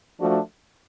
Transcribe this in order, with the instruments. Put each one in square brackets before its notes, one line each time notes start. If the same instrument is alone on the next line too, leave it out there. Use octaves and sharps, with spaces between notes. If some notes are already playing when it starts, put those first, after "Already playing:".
[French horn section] F3 A3 D4 F#4 A4